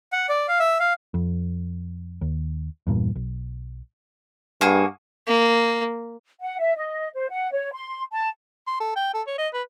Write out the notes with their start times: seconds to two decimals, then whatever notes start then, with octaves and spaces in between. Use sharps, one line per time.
0.12 F#5
0.29 D5
0.48 F5
0.60 E5
0.80 F5
1.14 F2
2.21 D#2
2.87 E2 G2 A#2
3.15 B1
4.61 G2 A#3 F#4 G#4
5.27 A#3
6.40 F#5
6.60 E5
6.75 D#5
7.13 C5
7.30 F#5
7.51 C#5
7.72 C6
8.12 A5
8.67 C6
8.80 A4
8.96 G5
9.14 A4
9.27 C#5
9.38 D#5
9.54 B4